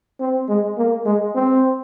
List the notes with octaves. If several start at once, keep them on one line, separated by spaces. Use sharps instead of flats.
C4
G#3
A#3
G#3
C4